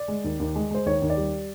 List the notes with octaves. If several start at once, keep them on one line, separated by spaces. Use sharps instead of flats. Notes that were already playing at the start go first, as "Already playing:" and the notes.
Already playing: D5
G#3
D#2
D#2
G#3
G#3 C5
D#2 C#5
D#2
D5
G3